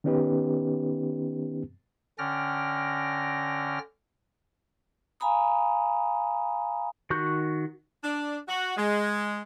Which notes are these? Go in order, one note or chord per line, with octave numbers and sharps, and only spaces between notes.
D#3 B3 C#4 D#4 G4 B4
D3 C#4 D5 G5 F6 A#6
F5 G#5 A#5 B5 D#6
D#3 F#4 C#6 F#6 G6
D4
F#4
G#3